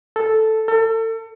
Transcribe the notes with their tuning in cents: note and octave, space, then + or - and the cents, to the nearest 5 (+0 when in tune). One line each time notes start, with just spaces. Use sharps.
A4 +0
A4 +35